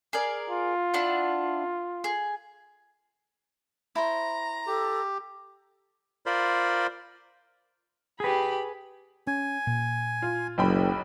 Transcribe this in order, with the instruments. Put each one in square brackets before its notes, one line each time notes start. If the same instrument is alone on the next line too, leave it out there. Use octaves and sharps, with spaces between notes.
[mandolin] G#4 A#4 D5
[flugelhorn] F4
[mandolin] D4 E4 F#5
G#4
[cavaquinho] E4 C5 [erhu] A#5
[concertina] G4 [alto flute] A4
[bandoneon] F4 A#4 C5 D5 B5 C6
[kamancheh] G4 B5 [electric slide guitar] G#4 B4
[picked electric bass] C#4 [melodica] G#5
[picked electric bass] A#2
[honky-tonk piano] F4
[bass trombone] F#1 [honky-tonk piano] B1 G5 B5